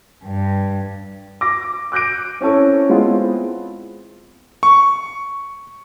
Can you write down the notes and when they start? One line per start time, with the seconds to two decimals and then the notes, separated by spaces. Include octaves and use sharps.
0.24 G2
1.41 D6 A#6
1.92 D6 F#6 G6 A#6 D7
2.41 C4 C#4 E4 A4 C#5
2.89 G#3 B3 C4 E4 F4
4.63 C#6